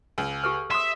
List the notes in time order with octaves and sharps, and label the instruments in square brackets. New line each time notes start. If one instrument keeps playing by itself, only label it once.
[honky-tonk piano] C#2
[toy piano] G4 A4 B4
[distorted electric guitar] E5 [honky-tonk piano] C6 D#6